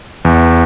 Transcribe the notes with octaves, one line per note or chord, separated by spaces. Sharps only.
E2